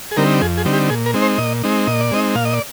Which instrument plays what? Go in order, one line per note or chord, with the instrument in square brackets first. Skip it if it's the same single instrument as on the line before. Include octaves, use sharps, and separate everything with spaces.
[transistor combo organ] G#4
D3 G3 C4 D#4 A#4
F2 G#4
G#4
D3 G3 C4 D#4
G4
A#2 G#4
A#4
G#3 C4 D#4
C5
A#2 D#5
G#3 C4 D#4
A#2 D#5
D5
G#3 C4 D#4 D#5
A#2 F5
D#5
D5